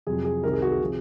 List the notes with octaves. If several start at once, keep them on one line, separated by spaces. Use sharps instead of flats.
F2 C3 F#3 G#4
G#4
C2 C3 D#3 A#4
G#4
F#4
G#4
C3 F3